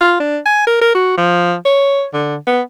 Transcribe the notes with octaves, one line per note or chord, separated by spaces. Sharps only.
F4
D4
G#5
A#4
A#4
F#4
F3
C#5
D3
B3